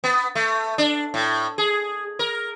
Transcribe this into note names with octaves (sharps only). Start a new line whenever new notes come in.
B3
A3
D4
A2
G#4
A#4